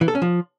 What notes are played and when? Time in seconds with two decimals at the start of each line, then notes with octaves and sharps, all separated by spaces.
0.01 E3
0.08 A4
0.15 C#4
0.22 F3